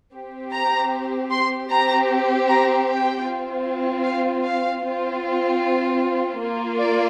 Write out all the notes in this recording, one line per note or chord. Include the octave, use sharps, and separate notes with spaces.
C4 G4
A#5
C6
C4 G4 A#5
A#5
G5
C4 F4
F5
F5
C4 F4
A#3 F4
D5